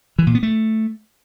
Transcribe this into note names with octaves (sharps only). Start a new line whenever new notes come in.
E3
A#2
B3
A3